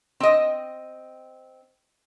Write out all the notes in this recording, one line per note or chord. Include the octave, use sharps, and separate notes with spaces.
C4 D#5